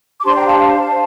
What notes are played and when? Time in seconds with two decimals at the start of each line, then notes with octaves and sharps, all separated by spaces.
0.20 D6
0.24 D4 G4 C5 A5 C6
0.35 G5 A#5
0.46 F5 A5
0.58 F5 A5
0.90 C5